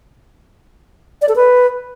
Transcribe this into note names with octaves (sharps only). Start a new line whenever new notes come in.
D5
A4
B4